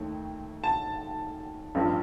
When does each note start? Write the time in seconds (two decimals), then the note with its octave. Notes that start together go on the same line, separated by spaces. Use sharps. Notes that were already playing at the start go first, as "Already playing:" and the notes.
Already playing: D#2 D#3 A3
0.64 A5
1.75 A1 G2 F3